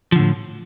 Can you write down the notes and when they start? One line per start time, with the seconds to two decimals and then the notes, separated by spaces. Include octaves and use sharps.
0.12 F3
0.16 D3
0.19 A2